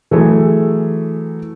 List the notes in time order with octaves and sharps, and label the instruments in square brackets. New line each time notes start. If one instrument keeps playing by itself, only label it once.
[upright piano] E3 F#3 A3 G#4